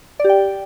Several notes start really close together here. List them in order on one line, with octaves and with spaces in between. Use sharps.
D5 G4 G5